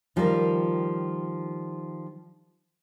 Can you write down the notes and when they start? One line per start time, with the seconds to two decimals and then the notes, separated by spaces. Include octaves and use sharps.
0.16 D#3 F3 G3 E4 F4 A#4